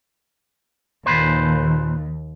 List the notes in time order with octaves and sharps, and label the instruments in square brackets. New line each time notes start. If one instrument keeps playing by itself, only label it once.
[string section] D#2 [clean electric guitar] A#2 B4 C5